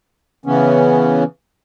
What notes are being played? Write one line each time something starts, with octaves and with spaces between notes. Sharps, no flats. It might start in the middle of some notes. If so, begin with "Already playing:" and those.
C#3 E3 B3 C#4